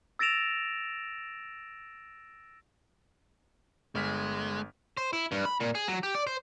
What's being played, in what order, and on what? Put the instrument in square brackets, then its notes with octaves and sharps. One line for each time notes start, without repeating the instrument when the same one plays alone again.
[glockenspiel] E6 A6 A#6 D7 E7 F7
[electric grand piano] G1 F6 B6 [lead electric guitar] G#3
[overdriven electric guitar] C5
E4
G2
B5
A#2
G#4
F#3
G4
D5
C5